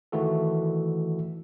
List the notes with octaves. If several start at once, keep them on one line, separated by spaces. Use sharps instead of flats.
D#3 E3 A3 F#4 A4